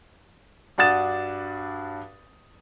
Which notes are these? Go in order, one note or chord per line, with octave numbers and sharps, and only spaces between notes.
G2 D4 F#4 D#6 A6 E7